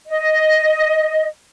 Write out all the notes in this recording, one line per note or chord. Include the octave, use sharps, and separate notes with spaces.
D#5